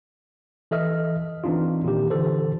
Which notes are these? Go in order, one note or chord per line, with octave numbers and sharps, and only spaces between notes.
E3 A4 D#5 E5 F6
E3 C4 D4 D#4 F4
A#2 D#3 G4
D3 E3 A4 C5